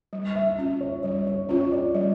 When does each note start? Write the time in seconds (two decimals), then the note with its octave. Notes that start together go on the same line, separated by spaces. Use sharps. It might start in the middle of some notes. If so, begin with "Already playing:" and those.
0.13 G3
0.35 E5
0.58 C#4 F4
0.81 C#5
1.03 G3 C#5
1.27 C#5
1.49 C#4 F4 C#5
1.71 D5
1.95 G3